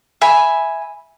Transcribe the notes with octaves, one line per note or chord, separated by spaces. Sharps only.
E5 G#5 B5